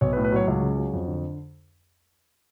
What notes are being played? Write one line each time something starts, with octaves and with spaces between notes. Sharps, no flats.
B1 C#5
B4
A2
B4
F#3 C#5
C#2
C#3
F#3
F2
D3